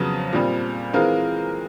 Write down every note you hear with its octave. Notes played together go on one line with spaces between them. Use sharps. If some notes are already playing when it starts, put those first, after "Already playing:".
Already playing: F2 C#3 F#3 B3
A#2 G3 C4
E3 G#3 C4 F4 A#4